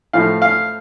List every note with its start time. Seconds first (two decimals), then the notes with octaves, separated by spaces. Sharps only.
0.13 A2 F3 A3 F5
0.42 F5